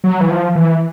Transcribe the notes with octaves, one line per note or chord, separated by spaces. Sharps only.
F#3
E3
F3
E3